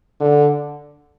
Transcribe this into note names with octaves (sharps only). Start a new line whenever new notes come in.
D3